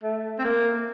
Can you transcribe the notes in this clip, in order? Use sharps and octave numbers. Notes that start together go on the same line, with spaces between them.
A3
C4
A#3